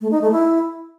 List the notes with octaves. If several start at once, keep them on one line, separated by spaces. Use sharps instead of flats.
A3
D#4
A3
E4